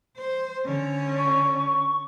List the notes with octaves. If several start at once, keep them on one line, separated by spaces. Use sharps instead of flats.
C5
D3 C#4
C#6